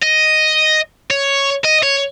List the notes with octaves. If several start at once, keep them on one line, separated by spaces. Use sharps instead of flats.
D#5
C#5
D#5
C#5